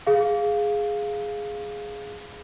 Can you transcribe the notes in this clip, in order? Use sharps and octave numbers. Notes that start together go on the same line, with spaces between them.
G#4 F5